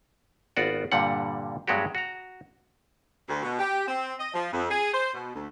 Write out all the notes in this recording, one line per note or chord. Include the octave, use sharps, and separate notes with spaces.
G#1 B3 F4 F#4 D5
G2 A#2 D3 G3 F#5
G2 F#3 G#3 B3 F#4 G4
F#4 A#5
D2
B2
G4
C4
D#5
F3
F2
G#4
C5
B2
D2